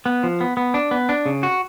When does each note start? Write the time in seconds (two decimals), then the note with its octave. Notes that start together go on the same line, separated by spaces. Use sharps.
0.06 B3
0.23 F3
0.41 B3
0.57 B3
0.74 D4
0.91 B3
1.09 D4
1.26 C#3
1.43 F#4